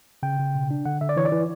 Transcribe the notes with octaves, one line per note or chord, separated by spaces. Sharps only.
C#3 G5
C#3
B2
D4
D3 F#5
D3 E5
D5
E3 C#5
D5
E3